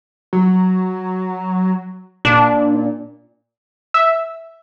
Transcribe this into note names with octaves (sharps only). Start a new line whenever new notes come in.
F#3
A#2 D4
E5